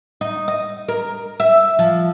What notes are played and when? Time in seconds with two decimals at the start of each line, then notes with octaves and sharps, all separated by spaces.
0.21 D#4
0.48 D#5
0.88 A#4
1.40 E5
1.79 F3